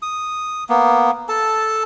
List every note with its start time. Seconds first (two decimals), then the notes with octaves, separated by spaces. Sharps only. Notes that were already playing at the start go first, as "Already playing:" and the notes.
0.02 D#6
0.69 A#3 B3
1.29 A4 A5